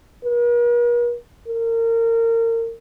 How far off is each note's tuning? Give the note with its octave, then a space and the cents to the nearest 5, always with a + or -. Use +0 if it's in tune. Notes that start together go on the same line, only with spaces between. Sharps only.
A#4 +45
A#4 -30